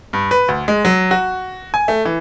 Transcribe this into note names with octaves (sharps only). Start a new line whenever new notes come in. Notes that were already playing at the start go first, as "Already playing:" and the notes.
G2
B4
D2
G#3
F#3
F#4
G#5
A3
E3